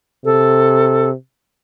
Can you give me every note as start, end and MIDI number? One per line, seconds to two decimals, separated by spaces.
0.25 1.13 48
0.25 1.09 69